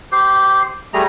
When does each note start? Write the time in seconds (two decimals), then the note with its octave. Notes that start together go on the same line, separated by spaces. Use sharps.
0.12 G4 C5
0.94 G3 A3 G#4 A#5